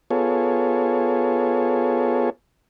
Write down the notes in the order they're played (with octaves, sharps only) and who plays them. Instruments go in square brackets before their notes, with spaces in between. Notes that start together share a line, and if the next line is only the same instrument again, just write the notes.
[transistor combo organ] B3 F4 G#4 A4 C#5